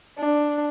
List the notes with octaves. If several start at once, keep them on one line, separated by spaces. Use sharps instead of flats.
D4